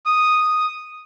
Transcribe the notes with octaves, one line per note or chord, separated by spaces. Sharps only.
D#6